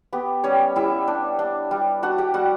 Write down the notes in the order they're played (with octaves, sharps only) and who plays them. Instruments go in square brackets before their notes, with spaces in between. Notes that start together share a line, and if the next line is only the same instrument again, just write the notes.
[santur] B3 G4
G3 C#4 C#5
G3 E4 E5
D4
D4
G3
D4 F#4 F#5
G4 G5
G3 F#4 F#5